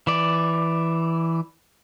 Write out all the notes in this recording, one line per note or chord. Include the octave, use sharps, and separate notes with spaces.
E3 D5